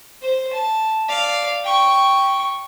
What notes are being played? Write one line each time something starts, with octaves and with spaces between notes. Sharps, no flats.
C5
A5
D5 F5
G5 C#6